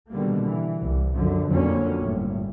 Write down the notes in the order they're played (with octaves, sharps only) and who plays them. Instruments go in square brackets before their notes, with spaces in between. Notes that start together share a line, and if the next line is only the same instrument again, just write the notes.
[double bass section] B2 D3 D#3 G3 A#3
E3
C2
F#2 D3 F3
F2 D3 F#3 A#3 C#4
G1 A2